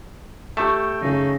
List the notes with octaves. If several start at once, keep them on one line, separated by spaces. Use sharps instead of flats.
A3 G4 G5 C#6 E7
F#2 C#3 D#4 G#4